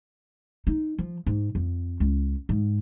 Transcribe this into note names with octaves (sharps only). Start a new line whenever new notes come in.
D#4
F3
G#2
F2
C#2
G#2